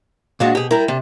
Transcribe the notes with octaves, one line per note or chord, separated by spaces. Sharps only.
A#2 G#3 D4 F#4 D5
B2 G4 G#4
G3 E4 A#4
C3 D4